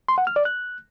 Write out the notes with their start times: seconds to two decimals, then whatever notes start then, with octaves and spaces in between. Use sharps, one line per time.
0.09 C6
0.18 F#5
0.27 F6
0.36 D5
0.45 F#6